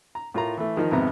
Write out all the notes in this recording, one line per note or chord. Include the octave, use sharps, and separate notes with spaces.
A#5
A2 F4 A#4 A#5
E3 A3
D#3 F3 D#4 A#4
G#1 F2 C3 B3 A#5